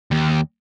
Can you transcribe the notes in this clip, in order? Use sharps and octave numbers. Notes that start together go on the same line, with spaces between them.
D#2